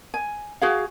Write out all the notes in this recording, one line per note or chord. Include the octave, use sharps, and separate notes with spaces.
G#5
F#4 G#4 F5